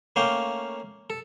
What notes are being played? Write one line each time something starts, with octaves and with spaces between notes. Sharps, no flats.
A3 A#3 C#4 F5 G5
A4